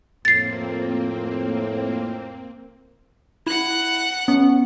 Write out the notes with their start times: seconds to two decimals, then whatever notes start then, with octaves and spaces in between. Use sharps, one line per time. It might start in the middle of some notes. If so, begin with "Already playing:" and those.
0.25 F2 A2 A#3 C4 A6 C7
3.47 E4 F#5 F#6
4.28 B3 C#4